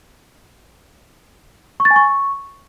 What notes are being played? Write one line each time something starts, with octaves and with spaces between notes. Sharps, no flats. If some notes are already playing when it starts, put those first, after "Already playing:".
C#6
A6
G#5
C#6